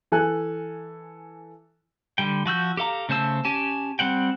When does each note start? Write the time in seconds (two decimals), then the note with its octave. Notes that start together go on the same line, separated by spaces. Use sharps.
0.12 E3 A4 G#5 F#6
2.18 D3 G3 G5
2.46 F3 F#4 E6 G6
2.77 G4 A4 F5 A#5
3.09 C#3 A3 C5 A5 E6
3.45 C#4 G4 G#5 A5
3.99 G3 C4 F#5 G5